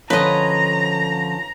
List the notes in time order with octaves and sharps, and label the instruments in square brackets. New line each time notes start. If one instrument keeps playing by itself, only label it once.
[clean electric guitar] D3 F3 [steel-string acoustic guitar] C#4 [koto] B4 D#5 [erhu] A#5